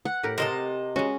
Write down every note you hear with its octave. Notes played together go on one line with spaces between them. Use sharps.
F#5
A2 G4 A#4
C3 A#4 C5 D#5 A5
G#3 C#4 F#4